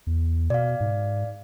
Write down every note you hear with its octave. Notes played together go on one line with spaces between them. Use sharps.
E2
B2 D5 F5
G#2